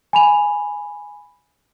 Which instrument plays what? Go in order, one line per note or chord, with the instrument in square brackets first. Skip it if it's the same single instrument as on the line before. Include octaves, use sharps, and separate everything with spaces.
[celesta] G#5 B5 F7